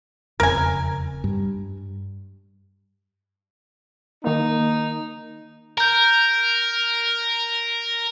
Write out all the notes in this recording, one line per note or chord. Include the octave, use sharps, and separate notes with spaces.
E1 F2 C#3 A#4 G#5
G2
D#3 A#3 D#4
A#4 A#5 G6